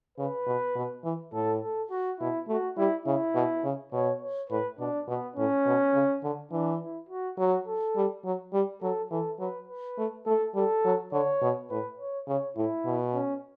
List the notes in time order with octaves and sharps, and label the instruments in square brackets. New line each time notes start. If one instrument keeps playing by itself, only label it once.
[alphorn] C#3 [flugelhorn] B4
[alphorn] B2
B2
E3
[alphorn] A2 [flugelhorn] A4
[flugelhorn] A4
F#4
[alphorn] B2 [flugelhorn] E4
[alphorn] A3 [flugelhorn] F#4
[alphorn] G3 [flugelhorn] E4
[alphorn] C#3 [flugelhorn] E4
[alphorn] B2
C#3
[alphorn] B2 [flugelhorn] C#5
[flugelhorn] C#5
[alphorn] A2 [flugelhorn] B4
[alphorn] B2 [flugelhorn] D4
[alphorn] B2 [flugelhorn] B3
[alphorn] A2 [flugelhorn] C#4
[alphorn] B2
C#3
D3
[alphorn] E3 [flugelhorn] D4
[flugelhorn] E4
F#4
[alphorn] F#3 [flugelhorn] F#4
[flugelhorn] A4
[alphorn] G3
F#3
G3
[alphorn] F#3 [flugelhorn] A4
[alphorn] E3 [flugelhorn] A4
[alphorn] F#3 [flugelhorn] B4
[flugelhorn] B4
[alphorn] A3
[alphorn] A3 [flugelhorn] A4
[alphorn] G3 [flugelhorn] A4
[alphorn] F#3
[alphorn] D3 [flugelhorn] C#5
[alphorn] B2
[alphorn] A2 [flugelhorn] B4
[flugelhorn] C#5
[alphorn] C#3 [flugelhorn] C#5
[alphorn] A2 [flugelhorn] E4
[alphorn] B2
[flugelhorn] C#4